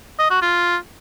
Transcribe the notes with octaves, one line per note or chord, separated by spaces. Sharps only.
D#5
F#4
F4